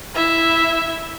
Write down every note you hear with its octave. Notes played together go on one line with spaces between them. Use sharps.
E4 E5